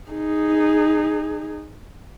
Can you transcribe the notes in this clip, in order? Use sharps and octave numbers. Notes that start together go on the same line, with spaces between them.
D#4 G#4